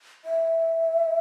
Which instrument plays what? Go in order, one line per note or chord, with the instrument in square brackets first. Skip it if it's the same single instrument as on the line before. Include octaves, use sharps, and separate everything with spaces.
[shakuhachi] E5